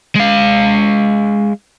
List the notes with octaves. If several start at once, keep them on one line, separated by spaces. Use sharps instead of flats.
G#3 F5